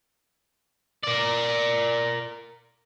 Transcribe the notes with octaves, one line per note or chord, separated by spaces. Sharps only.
A#4 D5